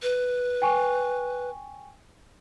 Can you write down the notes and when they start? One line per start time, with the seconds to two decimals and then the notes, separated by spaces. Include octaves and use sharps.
0.03 B4
0.62 G5 G#5 C#6